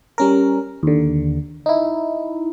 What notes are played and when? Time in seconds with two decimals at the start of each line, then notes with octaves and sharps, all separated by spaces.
0.18 G3 C#4 A#4
0.83 D#2 D3
1.66 D#4 E4